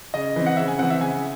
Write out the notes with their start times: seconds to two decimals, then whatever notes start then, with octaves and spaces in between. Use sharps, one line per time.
0.14 C#3 D#5
0.36 E3 C4
0.47 F#5
0.57 C#3 E5
0.68 G#5
0.79 E3 C4 F#5
0.90 E5
1.01 C#3 G#5